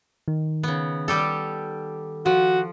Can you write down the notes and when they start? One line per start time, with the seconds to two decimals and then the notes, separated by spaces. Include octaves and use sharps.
0.28 D#3
0.63 C#3 B3
1.08 G3 G4 A4
2.26 F3 F#4